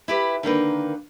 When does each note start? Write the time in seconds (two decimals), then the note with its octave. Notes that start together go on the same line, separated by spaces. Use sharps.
0.08 E4 G4 B4
0.43 D3 D#3 A#3 B4